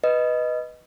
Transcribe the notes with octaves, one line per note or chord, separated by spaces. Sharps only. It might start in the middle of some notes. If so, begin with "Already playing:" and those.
B4 D#5